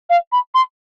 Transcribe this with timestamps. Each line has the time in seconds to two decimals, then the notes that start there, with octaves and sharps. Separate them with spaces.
0.10 F5
0.32 B5
0.54 C6